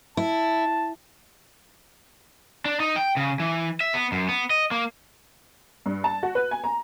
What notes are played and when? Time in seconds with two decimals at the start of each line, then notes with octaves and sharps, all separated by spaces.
0.17 E4 A5
2.66 D4
2.80 D#4
2.96 G5
3.17 C#3
3.40 E3
3.81 E5
3.94 B3
4.12 F#2
4.29 B3
4.51 D#5
4.71 A#3
5.86 G2
6.04 A5
6.23 F#4
6.35 B4
6.51 G#5
6.64 A#5